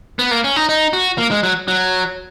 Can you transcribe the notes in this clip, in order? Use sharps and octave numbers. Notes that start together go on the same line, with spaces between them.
B3
A#3
C#4
D#4
D#4
F#4
A#3
G#3
F#3
F#3